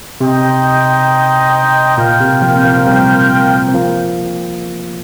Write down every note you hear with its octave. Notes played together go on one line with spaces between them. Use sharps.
C3 D#4 C5 D#5 G5
A#2 F4 A#4 G5
C3
F3 A#3
C4
F3 A#3
G3 C4
C4
F3 A#3